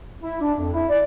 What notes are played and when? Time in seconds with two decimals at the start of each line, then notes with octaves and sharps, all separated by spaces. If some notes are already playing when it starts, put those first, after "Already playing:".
0.23 E4
0.41 D4
0.59 F2
0.74 E4
0.90 D5